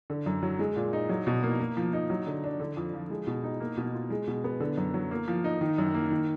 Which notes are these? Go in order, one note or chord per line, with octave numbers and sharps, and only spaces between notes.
D3
F#2
F#3
G#3
A#2
D#4
F#3
B2
A#3
A#3
F3
D#4
F#3
D3
D4
D3
F2
F3
G#3
B2
D#4
A#3
B2
F4
G#3
B2
B3
D3
F#2
F#3
A#3
F3
D#4
D#3
F#2
A#3
D#3